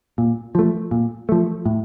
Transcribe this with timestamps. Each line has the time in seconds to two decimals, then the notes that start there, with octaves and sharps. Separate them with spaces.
0.18 A#2
0.55 F3 A3
0.91 A#2
1.29 F3 A3
1.66 A2